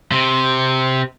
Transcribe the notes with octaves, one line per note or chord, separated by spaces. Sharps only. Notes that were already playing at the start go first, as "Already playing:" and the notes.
C3